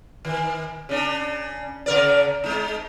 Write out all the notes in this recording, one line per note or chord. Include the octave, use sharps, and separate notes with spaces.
D#3
C#3 D4
C#3 A#4 D5
G#3 D#4